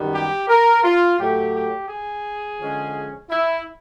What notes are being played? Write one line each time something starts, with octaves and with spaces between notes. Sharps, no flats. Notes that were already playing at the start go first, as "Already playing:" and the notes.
Already playing: F#2 D#3 G3 B3
G4
A#4
F4
A2 F#3 A3 G4
G4
G#4
D3 F3 G#3 C#4
E4